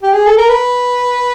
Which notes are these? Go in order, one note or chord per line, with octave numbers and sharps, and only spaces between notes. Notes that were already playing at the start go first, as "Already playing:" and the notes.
G4
G#4
A4
A#4
B4